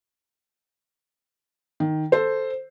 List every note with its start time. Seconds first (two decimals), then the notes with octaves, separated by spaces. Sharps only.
1.80 D#3
2.12 A4 C5